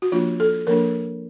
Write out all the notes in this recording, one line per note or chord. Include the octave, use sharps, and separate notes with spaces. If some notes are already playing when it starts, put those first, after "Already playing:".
F#4
F3 A#3 D4 F4
A4
F3 A#3 D4 A#4